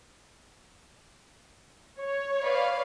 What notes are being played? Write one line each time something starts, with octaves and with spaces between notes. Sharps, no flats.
C#5
B4 D5 F5